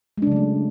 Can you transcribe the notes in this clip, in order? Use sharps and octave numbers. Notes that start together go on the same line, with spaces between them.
C#3 F#3 G#3 A3 D4